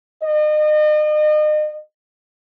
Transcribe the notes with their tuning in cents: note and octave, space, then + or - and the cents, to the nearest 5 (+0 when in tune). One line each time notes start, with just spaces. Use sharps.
D#5 -35